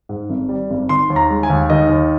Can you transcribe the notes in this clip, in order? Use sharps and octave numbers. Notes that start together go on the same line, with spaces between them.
G#2
G#1
G3
G#1
D#3 C6
D#2
A#5
G#3
G#5
D#2
D#3 D#5
D#2